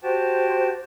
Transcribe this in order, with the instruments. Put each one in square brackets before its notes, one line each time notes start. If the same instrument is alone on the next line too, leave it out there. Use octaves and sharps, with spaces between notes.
[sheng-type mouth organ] F#4 G4 A5 [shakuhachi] C5